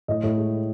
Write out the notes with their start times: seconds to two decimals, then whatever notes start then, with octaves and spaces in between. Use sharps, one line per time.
0.08 A2 D#5
0.23 A2
0.38 G#3